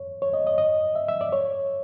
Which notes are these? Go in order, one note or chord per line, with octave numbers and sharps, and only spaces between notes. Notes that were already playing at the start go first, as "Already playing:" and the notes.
Already playing: C#5
C#5
D#5
D#5
D#5
E5
E5
D5
C#5